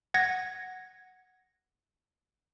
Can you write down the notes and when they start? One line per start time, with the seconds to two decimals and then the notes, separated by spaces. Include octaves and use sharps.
0.14 F#5 G#6 A#6